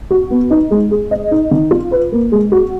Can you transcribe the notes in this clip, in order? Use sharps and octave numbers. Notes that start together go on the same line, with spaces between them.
F#4
B3
D#4
G#3
G#4
D#5
D#4
D#3
F4
B4
A#3
G#3
F#4